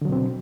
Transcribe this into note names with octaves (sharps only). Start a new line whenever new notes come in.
B2 D3 F#3 C4